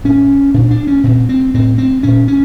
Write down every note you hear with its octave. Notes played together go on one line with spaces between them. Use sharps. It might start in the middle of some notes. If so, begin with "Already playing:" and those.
A2 C#4
A#2 D4
D4
C#4
A#2 C4
C4
A2 C4
C4
A#2 C#4
C#4